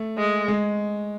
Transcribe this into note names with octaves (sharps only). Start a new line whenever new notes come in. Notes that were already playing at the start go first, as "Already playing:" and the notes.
Already playing: A3
G#3
G#3